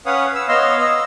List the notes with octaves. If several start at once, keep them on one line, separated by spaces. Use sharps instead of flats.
C#4 B4 C#5 F5 F#5 D#6
E6
B3 C#5 D#5 F5 C6 E6
D#5 E6